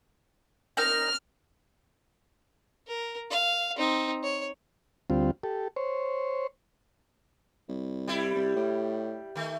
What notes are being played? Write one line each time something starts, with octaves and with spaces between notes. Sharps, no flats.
D#4 A#4 F6 G6
A#4
F5
C4 D#4
C#5
D2 G3 C4 F4
G4 A4
C5 C#5
C2
G3 E4
C2
A2
D#3 A3